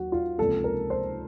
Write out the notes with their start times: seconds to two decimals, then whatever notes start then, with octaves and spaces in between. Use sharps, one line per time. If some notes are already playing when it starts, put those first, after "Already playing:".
Already playing: D#2 D#3 F#3 F#4
0.12 F4
0.38 C#2 C3 F3 A#3 A4
0.64 A#4
0.90 C5